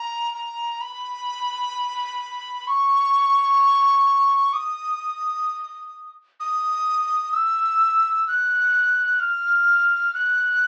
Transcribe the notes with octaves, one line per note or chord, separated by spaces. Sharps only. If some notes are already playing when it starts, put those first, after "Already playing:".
Already playing: A#5
A#5
B5
C#6
D#6
D#6
E6
F#6
F6
F#6